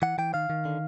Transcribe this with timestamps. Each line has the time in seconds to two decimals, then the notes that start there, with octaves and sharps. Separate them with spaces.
0.02 E3 F#5
0.18 E3 G5
0.34 D#3 F5
0.50 D#3
0.65 D3